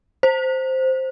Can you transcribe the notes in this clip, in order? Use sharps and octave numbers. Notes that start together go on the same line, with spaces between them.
C5